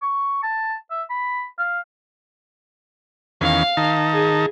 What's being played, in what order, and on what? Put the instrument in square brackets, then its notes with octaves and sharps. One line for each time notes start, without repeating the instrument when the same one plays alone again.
[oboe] C#6
A5
E5
B5
F5
[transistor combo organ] E2 D#3 C#4 [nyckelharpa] F5
[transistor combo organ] D#3 D#4 A5
[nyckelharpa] G#4